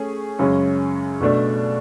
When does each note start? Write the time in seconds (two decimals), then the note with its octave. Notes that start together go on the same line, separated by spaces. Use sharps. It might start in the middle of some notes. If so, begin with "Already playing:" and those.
Already playing: A3 C#4 G#4
0.39 F#2 C#3 G#3 C#4
1.21 B2 A3 D4